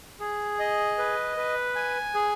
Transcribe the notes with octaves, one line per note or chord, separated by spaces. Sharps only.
G#4
D#5
B4
B4
G#5
G#4